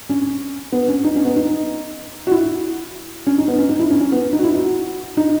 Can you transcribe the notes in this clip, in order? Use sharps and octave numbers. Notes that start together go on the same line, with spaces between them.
C#4
B3
C#4
D#4
C#4
B3
D#4
F#4
E4
C#4
D#4
B3
C#4
D#4
E4
C#4
C#4
B3
D#4
F#4
E4
F#4
D#4